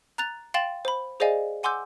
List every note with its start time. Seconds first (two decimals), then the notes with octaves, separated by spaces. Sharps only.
0.18 A#5 F#6 A6 F7
0.54 F5 G5 C6 A6 E7 F#7
0.85 C5 B5
1.20 G#4 C5 D5 D#5 F5 G#5
1.63 F#5 G#5 C6 D6 E6 G6